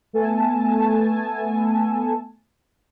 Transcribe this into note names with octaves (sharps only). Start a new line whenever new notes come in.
A3 B3 A4 G#5 A5